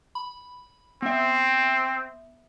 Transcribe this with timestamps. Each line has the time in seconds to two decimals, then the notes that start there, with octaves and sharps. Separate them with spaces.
0.15 B5
1.02 B3 C4 E5